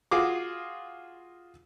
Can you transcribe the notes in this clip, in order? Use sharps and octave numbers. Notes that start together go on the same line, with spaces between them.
F4 F#4 G#4 D6